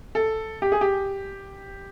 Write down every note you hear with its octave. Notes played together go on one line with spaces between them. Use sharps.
A4
G4
G#4
G4